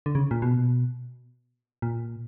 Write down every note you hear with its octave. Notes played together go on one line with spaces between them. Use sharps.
D3
C#3
A#2
B2
A#2